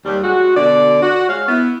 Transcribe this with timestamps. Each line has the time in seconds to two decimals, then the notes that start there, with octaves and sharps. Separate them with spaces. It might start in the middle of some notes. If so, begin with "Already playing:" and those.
0.06 D#2 G3
0.24 G#3 F#4
0.57 B2 D3 D5
1.03 F#4
1.29 G#3 C#5 F5
1.49 B3 E4